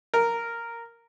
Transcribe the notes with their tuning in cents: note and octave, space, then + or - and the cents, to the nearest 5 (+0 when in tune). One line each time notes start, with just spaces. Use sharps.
A#4 -5